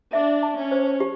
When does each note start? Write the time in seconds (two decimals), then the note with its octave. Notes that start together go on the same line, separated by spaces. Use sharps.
0.13 D4 E5
0.43 A5
0.57 C#4
0.71 C5
1.00 G4